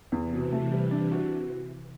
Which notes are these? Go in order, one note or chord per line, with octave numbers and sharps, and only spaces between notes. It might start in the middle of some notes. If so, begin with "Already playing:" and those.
E2 C3 E3
B2
A3
G3
D4
F#4